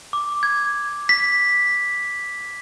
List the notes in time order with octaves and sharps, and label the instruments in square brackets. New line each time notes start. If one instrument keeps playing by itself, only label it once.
[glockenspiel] D6
G#6
B6